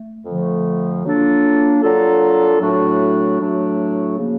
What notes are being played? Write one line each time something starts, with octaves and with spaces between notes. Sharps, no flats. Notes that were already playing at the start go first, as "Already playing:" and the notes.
Already playing: A3
F2 D3 F3 A3
F#3 A#3 D4 F4 A4
F#3 A#3 D4 F4 A4
A2 F#3 A3 D4 F#4
A2 F#3 A3 D4 F#4
C#3 F3 A#3